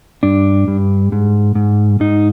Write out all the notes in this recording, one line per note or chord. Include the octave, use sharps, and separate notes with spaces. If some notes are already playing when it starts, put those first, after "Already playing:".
G2 D4
G2
G#2
G#2
G#2 D#4